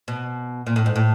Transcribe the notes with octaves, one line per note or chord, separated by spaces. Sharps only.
B2
A#2
A2
G#2
A2